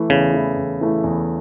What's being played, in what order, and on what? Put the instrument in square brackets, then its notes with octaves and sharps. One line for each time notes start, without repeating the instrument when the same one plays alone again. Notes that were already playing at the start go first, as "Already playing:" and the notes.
Already playing: [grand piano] E3 A3 E4
[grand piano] E2 [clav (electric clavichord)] C#3
[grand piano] E3 A3 E4
E2
E3 A3 E4
E2